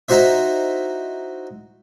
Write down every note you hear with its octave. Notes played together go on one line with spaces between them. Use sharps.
D#4 E4 F#4 C5 E5